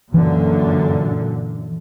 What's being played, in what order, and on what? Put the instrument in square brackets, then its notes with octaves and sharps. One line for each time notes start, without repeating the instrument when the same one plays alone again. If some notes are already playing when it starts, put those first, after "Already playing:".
[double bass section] F#2 A#2 D3 [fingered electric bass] E3